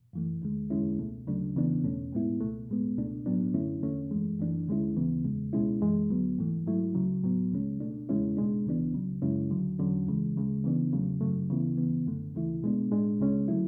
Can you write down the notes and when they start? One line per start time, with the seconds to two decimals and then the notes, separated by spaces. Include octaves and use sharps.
0.13 F#2 E3 A3
0.42 D2 D3 G#3
0.70 E2 D3 G#3 C#4 E4
0.99 C#2 B2 A3
1.27 D2 C#3 F#3 A3 D4
1.55 E2 C#3 E3 B3 D4
1.83 E2 B2 A3 C#4
2.12 A2 G#3 B3 E4
2.41 C#2 B2 A3
2.69 A2 G#3 B3
2.97 C#2 B2 A3 D4
3.26 A2 F#3 B3 D4
3.54 F#2 D3 A3 C#4 E4
3.83 E2 D3 A3 C#4
4.11 F#2 E3 G#3
4.40 F#2 E3 A3 D4
4.68 D2 D3 G#3 C#4 E4
4.96 D2 C#3 E3 B3
5.25 E2 C#3 G#3
5.53 C#2 B2 G#3 C#4 E4
5.81 F#2 E3 G#3
6.10 D2 D3 F#3 B3
6.38 G#2 E3 A3
6.67 G#2 F#3 A3 E4
6.95 C#2 C#3 F#3
7.23 A2 F#3 B3
7.52 C#2 C#3 G#3 C#4
7.80 B2 A3 D4
8.09 E2 C#3 G#3 C#4 E4
8.37 B2 G#3 D4
8.66 D2 C#3 E3 B3 D4
8.93 C#2 C#3 F#3
9.22 F#2 C#3 G#3 C#4 E4
9.51 D2 D3 F#3
9.79 E2 D3 F#3 C#4
10.07 C#2 C#3 E3 G#3
10.36 D2 C#3 G#3
10.64 C#3 E3 B3 D4
10.92 E2 C#3 F#3 A3
11.21 F#2 C#3 F#3 A3
11.49 D2 C#3 E3 B3 E4
11.77 C#2 C#3 E3 B3
12.06 F#2 D3 A3
12.35 D2 C#3 E3 A3 E4
12.63 B2 G#3 B3 D4
12.91 A2 G#3 D4
13.20 C#2 C#3 G#3 C#4
13.48 D3 F#3 A3 E4